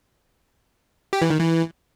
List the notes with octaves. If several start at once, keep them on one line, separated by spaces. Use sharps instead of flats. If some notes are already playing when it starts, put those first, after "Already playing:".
G4
E3
D#3
E3